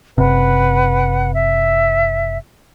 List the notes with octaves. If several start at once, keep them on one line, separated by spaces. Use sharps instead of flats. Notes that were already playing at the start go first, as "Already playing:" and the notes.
F#1 C3 B4 F#5
E5